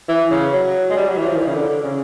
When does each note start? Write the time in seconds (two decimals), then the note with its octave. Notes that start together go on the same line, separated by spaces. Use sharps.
0.08 E3
0.30 C#3
0.53 F#3
0.90 G#3
0.97 G3
1.08 F#3
1.17 E3
1.28 F3
1.35 D#3
1.40 E3
1.47 C#3
1.54 D3
1.69 D3
1.84 C#3